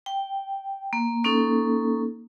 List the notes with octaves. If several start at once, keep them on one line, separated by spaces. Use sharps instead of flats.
G5
A#3
A#3 C#4 D#4 A4